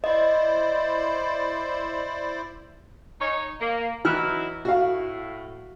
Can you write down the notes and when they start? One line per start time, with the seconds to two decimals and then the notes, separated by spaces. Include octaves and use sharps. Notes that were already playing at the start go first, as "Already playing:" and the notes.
0.04 E4 C5 D5 D#5
3.20 D#4 C#5
3.60 A#3
4.05 E3 F#3 D#4 E4 F6 F#6
4.65 A2 F#4 F5